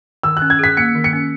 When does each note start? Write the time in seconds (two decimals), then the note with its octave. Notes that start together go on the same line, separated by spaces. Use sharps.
0.23 D#3 E6
0.37 F#6
0.42 C#4
0.50 G#6
0.59 G#4 B6
0.77 A#3 C#7
0.95 D#3
1.04 C#7
1.13 C#4